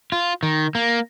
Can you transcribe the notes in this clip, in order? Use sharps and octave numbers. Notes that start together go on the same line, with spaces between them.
F4
D#3
A#3